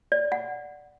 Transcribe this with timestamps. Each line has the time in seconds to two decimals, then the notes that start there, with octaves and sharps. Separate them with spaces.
0.12 D5
0.32 F#5